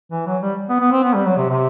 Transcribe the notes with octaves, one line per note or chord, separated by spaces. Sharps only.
E3
F#3
G3
B3
B3
C4
B3
G3
F#3
C3
C3